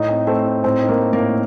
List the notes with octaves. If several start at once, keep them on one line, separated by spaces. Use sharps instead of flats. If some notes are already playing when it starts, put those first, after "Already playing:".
Already playing: A2 D#4 D#5
C4
A3 C4 C5
D#4
A2 C4 C5
D#4
A#3 A#4
A3
A#3 A#4
A2